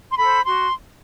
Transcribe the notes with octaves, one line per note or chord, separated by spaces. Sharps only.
C6
A4 B5
C5
F#4 C6